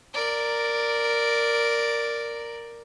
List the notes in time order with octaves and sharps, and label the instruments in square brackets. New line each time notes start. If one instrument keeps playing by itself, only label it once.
[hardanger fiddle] A#4 D5